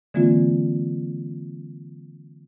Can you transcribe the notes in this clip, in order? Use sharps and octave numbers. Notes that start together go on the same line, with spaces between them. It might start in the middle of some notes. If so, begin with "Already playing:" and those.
D3 E3 G#3 A#3 C4 F4